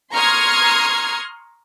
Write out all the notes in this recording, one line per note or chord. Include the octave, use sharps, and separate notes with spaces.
A#5 C6 C#6 D#6 F6 G#6